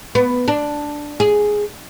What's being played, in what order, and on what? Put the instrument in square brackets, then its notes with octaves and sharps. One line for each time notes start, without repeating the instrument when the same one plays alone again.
[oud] B3
D4
G#4